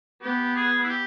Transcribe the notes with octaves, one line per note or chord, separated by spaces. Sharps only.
B3 G4
G#4
E4
G4